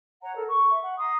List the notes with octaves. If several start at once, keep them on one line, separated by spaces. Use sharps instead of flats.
C#5 F#5 A#5
A4 A#4
C#6
E5
F#5
A#5 C6 D#6